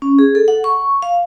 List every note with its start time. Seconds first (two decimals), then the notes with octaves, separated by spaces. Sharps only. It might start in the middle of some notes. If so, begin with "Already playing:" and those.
0.02 C#4
0.19 G#4
0.35 A4
0.48 F#5
0.64 C#6
1.02 F5